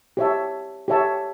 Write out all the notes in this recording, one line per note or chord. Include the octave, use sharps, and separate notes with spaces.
G4 C#5 E5 A5
G4 C#5 E5 A5